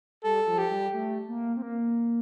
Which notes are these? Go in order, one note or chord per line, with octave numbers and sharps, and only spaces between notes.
G3 A4
F3
G4
G3
A3
A#3
C4
A#3